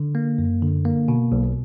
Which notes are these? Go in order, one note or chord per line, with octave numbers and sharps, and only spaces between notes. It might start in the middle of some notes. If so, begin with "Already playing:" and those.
Already playing: D3
A#3
F#2
D3
A#3
B2
B1